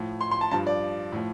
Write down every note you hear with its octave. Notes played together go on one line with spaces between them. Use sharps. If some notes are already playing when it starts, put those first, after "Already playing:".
Already playing: A2 F3
C6
C6
A5
G2 F3 A5
D5
A2 F3